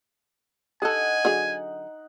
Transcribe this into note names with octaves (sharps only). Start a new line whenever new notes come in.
D#4 G#4 A4 F#5 G#5
D3 F#3 G#4